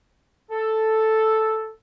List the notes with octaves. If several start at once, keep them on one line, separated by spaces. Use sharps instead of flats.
A4